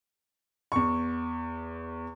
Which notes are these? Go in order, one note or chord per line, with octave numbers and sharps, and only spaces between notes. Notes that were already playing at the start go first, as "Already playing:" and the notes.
E2 C#6